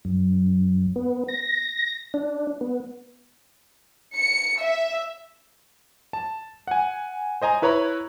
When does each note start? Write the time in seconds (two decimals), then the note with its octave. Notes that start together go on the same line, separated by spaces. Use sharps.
0.05 F#2
0.96 B3
1.28 A#6
2.14 D4
2.61 B3
4.16 C#7
4.62 E5
6.13 A5
6.67 F#5 G#5
7.42 C5 D#5 G#5 A#5
7.62 E4 B4 C#5 A#5 B5